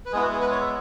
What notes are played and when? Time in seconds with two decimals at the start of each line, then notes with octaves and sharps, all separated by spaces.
0.06 B4
0.12 G#3 B3 E4 G#4
0.22 F#4
0.33 G#4
0.41 B4
0.51 C#5
0.60 E5